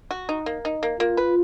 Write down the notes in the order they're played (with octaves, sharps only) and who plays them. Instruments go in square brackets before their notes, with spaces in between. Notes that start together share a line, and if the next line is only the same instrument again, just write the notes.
[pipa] F#4
D#4
A#3
D#4
A#3
[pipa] A#3 [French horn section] F4
[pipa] B4